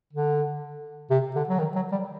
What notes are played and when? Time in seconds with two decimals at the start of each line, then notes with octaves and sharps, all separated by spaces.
0.13 D3
1.10 C3
1.35 D3
1.49 F#3
1.59 D#3
1.76 F#3
1.92 G3